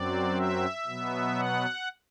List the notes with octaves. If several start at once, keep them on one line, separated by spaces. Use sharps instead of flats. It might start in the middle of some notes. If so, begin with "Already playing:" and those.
Already playing: F#2 F#3 C4 D5
E5
B2 F#3 B3
F#5